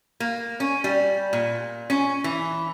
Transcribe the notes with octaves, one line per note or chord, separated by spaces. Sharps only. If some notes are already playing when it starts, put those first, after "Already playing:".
A#3
C#4
G3
A#2
C#4
E3